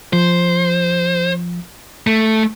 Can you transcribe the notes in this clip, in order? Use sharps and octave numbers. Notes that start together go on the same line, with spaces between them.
F3 C5
A3